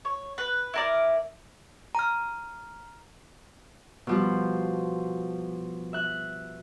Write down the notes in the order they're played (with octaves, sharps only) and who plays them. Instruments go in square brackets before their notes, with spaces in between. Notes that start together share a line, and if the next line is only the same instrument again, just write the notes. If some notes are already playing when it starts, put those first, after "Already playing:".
[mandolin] C#5
B4
E4 A#4 D5
[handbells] A#5 F6
[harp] B2 F3 G3
E5 F#6